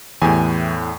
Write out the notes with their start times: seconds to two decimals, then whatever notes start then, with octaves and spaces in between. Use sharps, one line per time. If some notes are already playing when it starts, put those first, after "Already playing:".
0.22 E2 A2 E3 G4 G#4 G#5